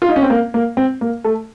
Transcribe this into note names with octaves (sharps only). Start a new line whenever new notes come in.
F4
D#4
C#4
C4
A#3
A#3
C4
A#3
A3